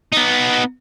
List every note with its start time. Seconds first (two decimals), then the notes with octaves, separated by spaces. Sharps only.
0.12 B3 D#4